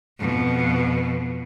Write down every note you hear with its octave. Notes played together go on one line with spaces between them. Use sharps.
F2 B2